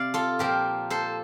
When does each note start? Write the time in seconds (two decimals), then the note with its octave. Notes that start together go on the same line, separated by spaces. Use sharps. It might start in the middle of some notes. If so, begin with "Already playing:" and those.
Already playing: C3 D5 F5
0.14 F4 A4
0.39 A#2 F3 G4 A#4
0.90 A4 C5